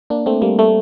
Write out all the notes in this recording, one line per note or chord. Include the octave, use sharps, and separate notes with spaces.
A#3 D4
A3 C4
G3 A#3
A3